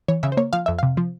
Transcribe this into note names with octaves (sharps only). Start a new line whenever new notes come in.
E3 C#5
C#3 E5
C5
A#3 C#5
F3 F5
F2 E5
C3 F5
F3